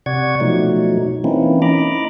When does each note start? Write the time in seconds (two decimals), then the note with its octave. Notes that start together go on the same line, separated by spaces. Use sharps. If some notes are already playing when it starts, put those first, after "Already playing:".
0.06 C3 D5 F#5 C#6 G#6
0.40 B2 F3 F#3 A3 D#4
1.24 E3 A#3 C4 C#4 D#4 E4
1.62 D#5 A#5 B5 D6